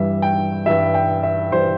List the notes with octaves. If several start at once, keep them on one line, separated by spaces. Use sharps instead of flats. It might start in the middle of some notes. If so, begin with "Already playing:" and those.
Already playing: G2 E3 G3 E5
G5
G2 E3 G3 E5
G5
E5
G2 E3 G3 C5